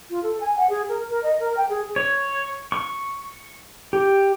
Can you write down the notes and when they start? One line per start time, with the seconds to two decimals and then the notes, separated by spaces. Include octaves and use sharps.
0.10 F4
0.23 A4
0.41 G#5
0.57 F#5
0.69 G#4
0.89 A#4
1.09 A#4
1.23 D#5
1.40 A#4
1.57 G5
1.69 G#4
1.96 C#5
2.72 C#6
3.93 G4